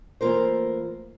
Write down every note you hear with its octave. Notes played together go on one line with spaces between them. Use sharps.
E3 A3 A#3 F4 A#4 C5